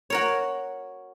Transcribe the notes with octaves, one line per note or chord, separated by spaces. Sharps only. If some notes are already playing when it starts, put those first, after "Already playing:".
F#4 A#4 C#5